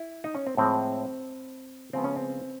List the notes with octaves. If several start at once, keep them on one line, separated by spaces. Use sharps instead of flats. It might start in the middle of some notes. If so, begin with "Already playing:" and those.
Already playing: E4
D#4
C#4
C4
A2 F3 G#3 C4
C#3 F3 G#3 B3 C4
C#4
C4